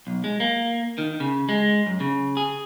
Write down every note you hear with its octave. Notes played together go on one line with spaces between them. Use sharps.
B1
G#3
A#3
D#3
C#3
G#3
F#2
C#3
G#4